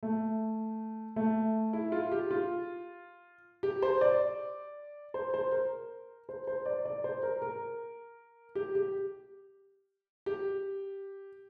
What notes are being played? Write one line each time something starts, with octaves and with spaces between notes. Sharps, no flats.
A3
A3
E4
F4
G4
F4
G4
C5
D5
C5
C5
A#4
C5
C5
D5
D5
C5
A#4
A#4
G4
G4
G4